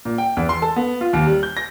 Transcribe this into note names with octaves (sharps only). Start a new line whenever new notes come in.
A#2
G5
E2
C6
A4
B3
F4
D#2
G3
G6
A#6